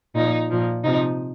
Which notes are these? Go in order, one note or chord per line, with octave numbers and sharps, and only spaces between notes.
A#2 F3 D#4
A#2 F3
C3 F3 D#4